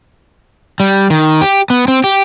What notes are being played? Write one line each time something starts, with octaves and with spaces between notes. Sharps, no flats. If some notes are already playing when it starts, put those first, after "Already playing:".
G3
D#3
G4
B3
C4
G4